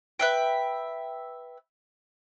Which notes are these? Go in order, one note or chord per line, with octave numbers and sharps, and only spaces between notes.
B4 E5 G5